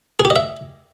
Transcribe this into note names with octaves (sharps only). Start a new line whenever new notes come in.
G#4
G4
D#5
E5